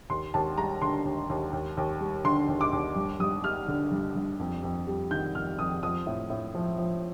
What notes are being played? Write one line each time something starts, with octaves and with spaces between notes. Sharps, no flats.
D#2 C6
D#2 A5
G3 A#5
D3 C6
D#2
D#2
D#2
D#2
G3
D3 C6
D#2
D6
D#2
G2
G2 D#6
G3 F6
D3
G2
G2
F2
F2
G3
D#3 G6
F2 F6
F2 D#6
F3 D#6
A2
A2
F3
F3